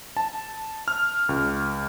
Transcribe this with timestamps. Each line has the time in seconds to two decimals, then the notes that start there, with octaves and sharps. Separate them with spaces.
0.17 A5
0.88 F6
1.29 C#2